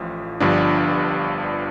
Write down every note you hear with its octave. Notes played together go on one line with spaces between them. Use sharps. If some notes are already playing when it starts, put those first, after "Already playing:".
Already playing: A1 A2 F3
G1 G2 F3 D4